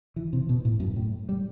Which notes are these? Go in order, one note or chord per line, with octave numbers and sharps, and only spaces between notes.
E3
C3
B2
A2
F#2
A2
G3